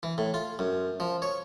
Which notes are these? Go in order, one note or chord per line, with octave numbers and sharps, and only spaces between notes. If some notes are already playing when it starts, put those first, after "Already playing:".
E3
A2
F4
F#2
F3
C#5